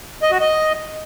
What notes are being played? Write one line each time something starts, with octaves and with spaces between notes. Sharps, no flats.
D#5
F#4
D#5